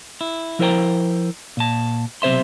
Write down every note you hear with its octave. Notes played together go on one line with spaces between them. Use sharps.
E4
F3 E4 A#4 C5 G5 A#5
A#2 A5
B1 C3 C5 E5 C6